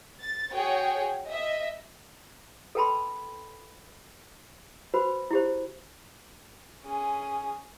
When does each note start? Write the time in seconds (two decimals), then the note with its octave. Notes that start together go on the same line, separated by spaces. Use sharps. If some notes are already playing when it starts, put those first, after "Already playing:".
0.19 A6
0.52 F#4 G#4 C#5 G5
1.27 D#5 E5
2.75 A4 B4 G5 A5 B5 C6
4.94 F#4 B4 C5 B5
5.31 E4 G4 C5
6.83 C#4 G#4